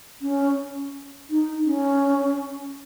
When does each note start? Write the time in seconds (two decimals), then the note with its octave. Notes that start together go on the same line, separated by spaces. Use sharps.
0.22 C#4
1.30 D#4
1.66 C#4